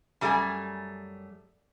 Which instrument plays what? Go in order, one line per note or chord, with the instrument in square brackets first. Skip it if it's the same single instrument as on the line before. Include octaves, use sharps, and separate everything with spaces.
[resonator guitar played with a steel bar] F#2 G3 A3 F#4 G#4 G#5